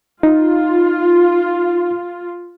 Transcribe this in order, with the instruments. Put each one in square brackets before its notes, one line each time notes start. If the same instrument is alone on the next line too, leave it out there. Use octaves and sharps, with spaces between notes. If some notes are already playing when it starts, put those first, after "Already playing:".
[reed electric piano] D#4 [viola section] F4